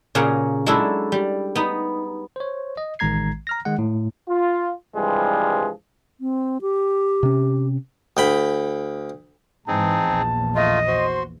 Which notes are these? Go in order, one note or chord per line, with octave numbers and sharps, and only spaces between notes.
A#2 C#3 A#3 G#4 F#5
F#3 G#3 D4 E4 G#4 A4
G3
B3 D#4
C5 C#5
D#5
A1 D#3 G#3 A#5 G#6 C7
A#5 F6 A#6
D#3 G#3 F#5
A2
F4
G2 C3 E3 F3 G3 G#3
C4
G4
C3 C#4
D2 G5 B5
G#2 E3 C4 D#4 G#4 A5
A#1 E2 F3
A3 F4 D#5
F#4 C5 C6